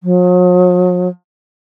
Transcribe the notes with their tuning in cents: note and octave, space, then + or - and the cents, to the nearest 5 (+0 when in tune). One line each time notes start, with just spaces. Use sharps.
F#3 -45